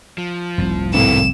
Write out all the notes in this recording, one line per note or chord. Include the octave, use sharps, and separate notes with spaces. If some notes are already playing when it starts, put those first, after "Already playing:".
F3
F1 C2 G#2
G#1 A2 D#3 A#3 B3 E7